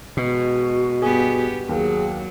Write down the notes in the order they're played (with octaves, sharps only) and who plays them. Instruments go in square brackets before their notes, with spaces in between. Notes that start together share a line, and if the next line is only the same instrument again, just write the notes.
[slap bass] B2 [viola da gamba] G#3 [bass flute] F#4
[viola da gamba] G2 B3 G4 [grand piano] G#4
[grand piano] D#2 [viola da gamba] F#3 [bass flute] G#4